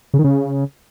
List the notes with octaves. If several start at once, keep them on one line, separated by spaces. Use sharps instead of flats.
C#3
D#3
C#3